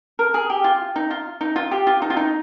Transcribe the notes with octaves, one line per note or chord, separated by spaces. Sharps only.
A#4
G#4
G4
F4
D#4
F4
D#4
F4
G4
F4
D#4
F4
D#4